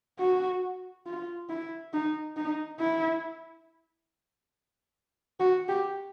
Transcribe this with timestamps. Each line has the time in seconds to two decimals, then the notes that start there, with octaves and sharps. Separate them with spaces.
0.19 F#4
1.06 F4
1.49 E4
1.93 D#4
2.37 D#4
2.80 E4
5.40 F#4
5.69 G4